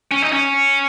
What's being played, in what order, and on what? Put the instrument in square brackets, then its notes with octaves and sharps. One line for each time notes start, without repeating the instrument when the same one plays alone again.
[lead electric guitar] C#4
D#4
C#4